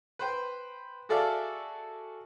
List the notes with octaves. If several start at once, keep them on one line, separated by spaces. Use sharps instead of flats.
B4 C5 G5
F#4 G#4 A4 D5 E5 F5